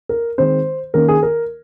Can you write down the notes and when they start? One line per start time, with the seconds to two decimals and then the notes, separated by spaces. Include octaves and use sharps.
0.09 A#4
0.38 D#3 G#3 C4 C5
0.94 D#3 A#3 C#4 A#4
1.08 G#4
1.23 A#4